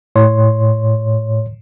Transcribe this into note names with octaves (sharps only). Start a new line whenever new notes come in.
A2 C#5 C6